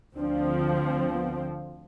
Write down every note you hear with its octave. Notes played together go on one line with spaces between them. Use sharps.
D2 D3 F3 C4 D4
B3